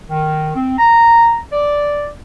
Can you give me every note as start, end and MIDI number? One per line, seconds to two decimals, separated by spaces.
0.10 0.51 51
0.55 0.74 60
0.78 1.38 82
1.52 2.08 74